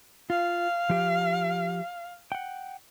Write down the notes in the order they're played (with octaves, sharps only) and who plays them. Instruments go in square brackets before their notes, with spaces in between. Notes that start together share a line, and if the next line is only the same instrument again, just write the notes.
[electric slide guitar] F4 [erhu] F5
[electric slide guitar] F3 G4
F#5 G5